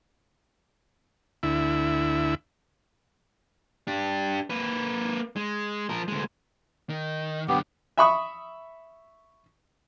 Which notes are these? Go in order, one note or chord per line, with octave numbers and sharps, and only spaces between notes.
D2 E4
D4 G4
A#3 B4
G#3
F3 A#4
D2 G#3
D#3
F#2 D3 B3 G4
E5 B5 C#6 D#6